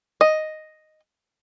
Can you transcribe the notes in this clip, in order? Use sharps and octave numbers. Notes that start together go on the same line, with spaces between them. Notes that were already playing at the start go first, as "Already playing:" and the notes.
D#5